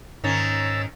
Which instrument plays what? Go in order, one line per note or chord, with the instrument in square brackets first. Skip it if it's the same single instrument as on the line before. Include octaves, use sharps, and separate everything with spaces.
[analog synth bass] G#2 [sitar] D#3 C#4 [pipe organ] A#5 E6 A6